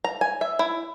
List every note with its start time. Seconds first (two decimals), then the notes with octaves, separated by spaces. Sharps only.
0.04 A#5
0.21 G#5
0.41 E5
0.59 E4